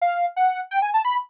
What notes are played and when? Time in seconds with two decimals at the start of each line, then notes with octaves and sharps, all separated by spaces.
0.01 F5
0.36 F#5
0.71 G5
0.82 G#5
0.94 A5
1.05 B5